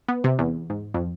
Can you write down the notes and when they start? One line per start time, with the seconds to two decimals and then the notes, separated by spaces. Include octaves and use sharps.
0.08 B3
0.24 C3
0.39 E2
0.70 G#2
0.94 F2